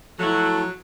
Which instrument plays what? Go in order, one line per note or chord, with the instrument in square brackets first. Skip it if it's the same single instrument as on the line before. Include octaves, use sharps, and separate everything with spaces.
[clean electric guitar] F3 E4 [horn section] F#3 [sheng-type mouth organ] A3 A4